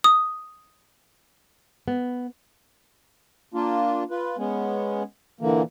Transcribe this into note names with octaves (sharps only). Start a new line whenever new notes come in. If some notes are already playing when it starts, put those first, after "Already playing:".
D#6
B3
A#3 D4 F4
F4 B4
G#3 B3 C#4
A#2 D3 E3 A#3